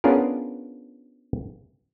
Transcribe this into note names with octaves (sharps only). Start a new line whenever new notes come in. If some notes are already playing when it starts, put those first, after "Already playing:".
B3 C#4 D4 F4 G#4 A#4